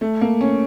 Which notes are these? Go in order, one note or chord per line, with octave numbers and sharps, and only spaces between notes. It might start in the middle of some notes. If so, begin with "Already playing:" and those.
A3
A#3
C#4